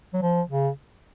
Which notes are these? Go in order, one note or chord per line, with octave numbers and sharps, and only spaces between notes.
F#3
F3
C#3